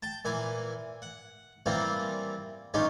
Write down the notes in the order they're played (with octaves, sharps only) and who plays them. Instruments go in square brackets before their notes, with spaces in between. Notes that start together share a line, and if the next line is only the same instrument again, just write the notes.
[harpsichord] G5 A5
A#2 E3 G#5
F#5
E3 G3 A#3 C4 F4
G2 C#4 D#4 F4 G4